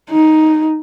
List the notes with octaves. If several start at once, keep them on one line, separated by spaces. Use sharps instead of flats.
D#4